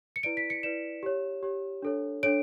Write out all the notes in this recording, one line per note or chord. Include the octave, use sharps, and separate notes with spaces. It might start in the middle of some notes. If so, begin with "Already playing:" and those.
C#7
E4 B4 D5 D7
B6
C#7
E4 B4 D5 E7
G4 C#5
G4 C#5
D4 A4 C#5
D4 A4 C#5 D7